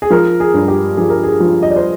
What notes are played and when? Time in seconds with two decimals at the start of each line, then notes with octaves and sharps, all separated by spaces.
0.02 G#4
0.10 F3 A#4
0.40 G#4
0.54 G2
0.68 G4
0.97 F3 G#4
1.10 A#4
1.23 G#4
1.40 F3
1.63 D#5
1.70 D5
1.76 C5